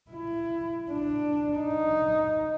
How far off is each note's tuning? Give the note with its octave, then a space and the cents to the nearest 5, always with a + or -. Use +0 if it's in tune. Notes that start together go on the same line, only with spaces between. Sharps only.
E4 +25
D4 +10
D#4 +0